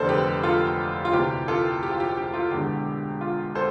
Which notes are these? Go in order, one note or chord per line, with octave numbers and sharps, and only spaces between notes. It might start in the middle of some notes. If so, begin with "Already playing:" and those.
Already playing: F1 E2 D3 A4 C5 D5
G4 B4
F4 A4
F4
D2 C3 E3 G4
F4 A4
G4
F4
G4
G4
F4 A4
E1 E2 D3 G4
F4
A4 C5